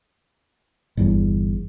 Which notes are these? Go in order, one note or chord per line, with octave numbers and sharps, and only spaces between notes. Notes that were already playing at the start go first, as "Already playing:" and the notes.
G1 E2